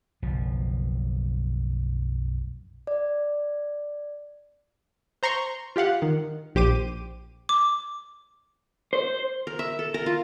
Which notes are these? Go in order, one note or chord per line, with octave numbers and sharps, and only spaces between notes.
F#1 B1 F3
D5
C5 A#5 C6 C#6
F4 G4 F5 F#5
D#3
A#1 G4 C5 D6 D#7
D6
C5
A#4
E5
A4
A#4
F4